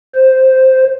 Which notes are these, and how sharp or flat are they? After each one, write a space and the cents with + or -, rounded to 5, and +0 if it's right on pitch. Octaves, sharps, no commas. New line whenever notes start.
C5 +0